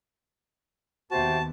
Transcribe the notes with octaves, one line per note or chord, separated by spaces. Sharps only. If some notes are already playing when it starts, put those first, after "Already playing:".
D#2 B3 F#4 G4 C5 E5 A5